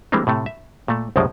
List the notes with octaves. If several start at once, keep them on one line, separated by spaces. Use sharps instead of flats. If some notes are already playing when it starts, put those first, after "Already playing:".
E3 G3 G#3 A#3 C4 D4
A2 C3 A3
E5
A#2 A3
C2 F#2 C#3 F3 G#3 G5